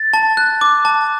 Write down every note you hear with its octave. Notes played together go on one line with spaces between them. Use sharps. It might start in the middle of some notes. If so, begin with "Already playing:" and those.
Already playing: A6
A5
F#6
D6
A5